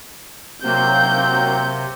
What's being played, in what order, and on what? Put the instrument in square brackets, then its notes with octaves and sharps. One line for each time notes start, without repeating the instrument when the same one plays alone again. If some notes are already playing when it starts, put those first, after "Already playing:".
[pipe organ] C3 [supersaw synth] F#3 A#3 [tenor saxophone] C4 [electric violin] G6